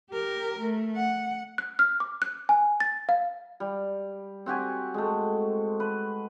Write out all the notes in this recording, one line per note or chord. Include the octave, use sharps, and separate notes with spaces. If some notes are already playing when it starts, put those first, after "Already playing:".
G4 A#4
A3
F#5
F#6
F6
D6
F#6
G#5
A6
F5
G3
C4 F#4 G4 G#5
G#3 A3
B4